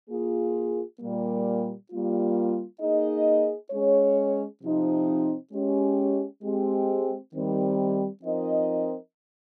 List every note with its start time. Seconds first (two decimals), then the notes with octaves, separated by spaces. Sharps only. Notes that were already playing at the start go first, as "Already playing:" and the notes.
0.09 A#3 F4 G#4
1.00 A#2 G3 A#3
1.91 G3 A#3 F4
2.81 A#3 D#4 G#4 D#5
3.71 G#3 C#4 G#4 C#5
4.62 C3 F3 C4 D#4
5.53 G#3 C#4 G4
6.43 G#3 C4 G4
7.34 D#3 G3 C4
8.23 F3 C4 D#4 A#4 D#5